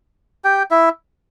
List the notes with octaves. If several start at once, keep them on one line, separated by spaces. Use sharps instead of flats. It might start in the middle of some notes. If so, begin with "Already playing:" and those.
G4 G5
E4 E5